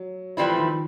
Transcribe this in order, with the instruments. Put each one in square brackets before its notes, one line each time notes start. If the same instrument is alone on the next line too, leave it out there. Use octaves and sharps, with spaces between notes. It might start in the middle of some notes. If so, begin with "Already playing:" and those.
Already playing: [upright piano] F#3
[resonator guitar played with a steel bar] A2 E3 G3 C4 E4 [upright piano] F3
[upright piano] D#3